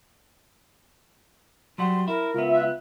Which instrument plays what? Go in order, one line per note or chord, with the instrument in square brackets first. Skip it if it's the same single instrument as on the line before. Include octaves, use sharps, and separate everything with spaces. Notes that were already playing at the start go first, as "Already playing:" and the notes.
[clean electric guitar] F#3 G3 F#5 [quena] C6
[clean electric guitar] E4 [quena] A#4
[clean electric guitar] C#2 B3 [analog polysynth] F4 E5
[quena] F#6